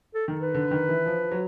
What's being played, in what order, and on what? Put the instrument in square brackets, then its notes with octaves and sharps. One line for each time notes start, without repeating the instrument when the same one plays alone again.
[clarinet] A4
[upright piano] D#3
[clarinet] B4
[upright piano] D3
D#3
E3
F3
F#3